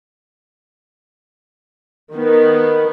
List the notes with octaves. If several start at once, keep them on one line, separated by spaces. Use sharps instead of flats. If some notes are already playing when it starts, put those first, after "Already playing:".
D#3 B3